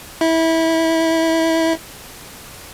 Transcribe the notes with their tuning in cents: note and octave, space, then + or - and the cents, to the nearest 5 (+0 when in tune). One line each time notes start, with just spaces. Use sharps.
E4 -20